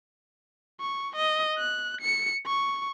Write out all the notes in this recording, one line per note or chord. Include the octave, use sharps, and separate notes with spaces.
C#6
D#5
F#6
C#7
C#6